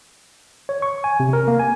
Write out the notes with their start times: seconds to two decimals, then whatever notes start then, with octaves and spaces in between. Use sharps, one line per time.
0.69 C#5
0.82 C#6
1.04 G#5
1.20 C3
1.33 A#4
1.48 A#3
1.59 G#5